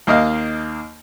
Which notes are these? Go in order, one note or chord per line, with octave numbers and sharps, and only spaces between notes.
D#2 A#3 D#5 F5